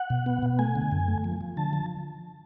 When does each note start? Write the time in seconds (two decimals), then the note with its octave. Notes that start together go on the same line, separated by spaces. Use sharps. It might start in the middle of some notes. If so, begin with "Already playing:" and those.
Already playing: F#5
0.10 B2
0.26 B3
0.43 B2
0.59 A3 G#5
0.76 D3
0.92 F#2
1.08 A3
1.24 F3
1.41 F3
1.57 D3 A5
1.73 F3